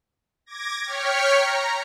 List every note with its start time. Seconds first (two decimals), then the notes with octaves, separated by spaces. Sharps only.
0.46 D6 G#6 A#6
0.85 C#5 G5 F6 B6 C#7
1.36 A#5